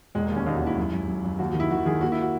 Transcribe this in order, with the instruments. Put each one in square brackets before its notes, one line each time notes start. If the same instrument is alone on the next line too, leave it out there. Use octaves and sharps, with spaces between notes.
[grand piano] E1 [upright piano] G#3
[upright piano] A#3
[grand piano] D#2
[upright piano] C#4
[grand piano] D#2 [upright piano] D#4
[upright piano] F#4
[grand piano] D#2 [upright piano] E4
[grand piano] F#2
F#2
F#2
F#2
[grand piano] D#2 [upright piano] F#4
[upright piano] F#4
[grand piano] D#3
[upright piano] E4
[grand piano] D#3 [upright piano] F#4
[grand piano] D#3 [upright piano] G#4
[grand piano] A#3 [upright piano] F#4
[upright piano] E4
F#4